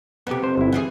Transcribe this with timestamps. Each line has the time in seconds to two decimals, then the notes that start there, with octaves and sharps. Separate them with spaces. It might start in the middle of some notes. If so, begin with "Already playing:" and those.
0.27 F2 C3 B3 G4
0.43 C5
0.57 G1 E4
0.72 E3 G3 G#4